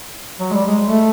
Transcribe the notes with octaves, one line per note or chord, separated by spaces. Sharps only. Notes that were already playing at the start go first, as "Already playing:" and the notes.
F#3
G#3
G3
G#3
A3